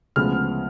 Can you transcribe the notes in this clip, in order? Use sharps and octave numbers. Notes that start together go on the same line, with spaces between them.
D2 C#3 F3 G#3 B3 F6